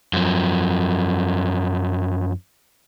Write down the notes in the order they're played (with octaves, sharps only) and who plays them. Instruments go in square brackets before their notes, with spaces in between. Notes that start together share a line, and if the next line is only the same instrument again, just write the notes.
[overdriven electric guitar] F#2 F3